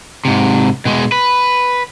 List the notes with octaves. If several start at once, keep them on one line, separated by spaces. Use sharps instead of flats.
G#2 C3
B2 G#3
B4